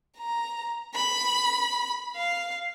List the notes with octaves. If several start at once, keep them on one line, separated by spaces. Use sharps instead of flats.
A#5
B5
F5